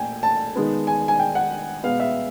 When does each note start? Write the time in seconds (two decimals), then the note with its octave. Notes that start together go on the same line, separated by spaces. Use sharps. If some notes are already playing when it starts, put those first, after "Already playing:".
Already playing: A#2 A3 G5 G#5
0.23 A5
0.55 D#3 G#3 B3
0.87 G#5
1.08 G#5
1.19 G5
1.35 F#5
1.83 B2 G#3 B3 F5
2.00 E5